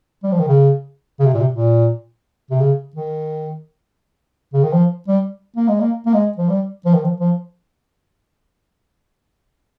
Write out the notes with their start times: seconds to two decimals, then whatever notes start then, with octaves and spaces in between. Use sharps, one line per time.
0.23 G3
0.32 F3
0.40 D#3
0.49 C#3
1.20 C#3
1.26 C3
1.34 A#2
1.40 C3
1.54 A#2
2.51 C3
2.61 C#3
2.96 D#3
4.54 C#3
4.63 D#3
4.73 F3
5.08 G3
5.56 A#3
5.68 G#3
5.80 A#3
6.06 A#3
6.14 G#3
6.38 F3
6.49 G3
6.86 F3
6.94 D#3
7.04 F3
7.20 F3